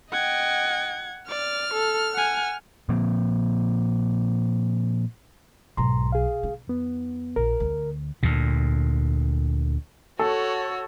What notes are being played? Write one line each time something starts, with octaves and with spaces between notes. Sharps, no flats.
D#5 F#5 G5 G#6
D5 F6
A4
F#5 G#5
A#2 F3 A#3 C4
B1 G#2 A#5 C6
G#4 F5
D#4
F2 B3
A#1 A#4
D2
D2 A#2
F#4 A4 C#5